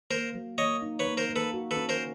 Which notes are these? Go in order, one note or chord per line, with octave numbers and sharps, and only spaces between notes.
A#3 A#4 C5
F#3
A#3 C#5 D#5
D#4
B4 C#5
A#3
A#4 C5
A#3
A4 B4
F#4
A4 B4
C#4
A#4 C5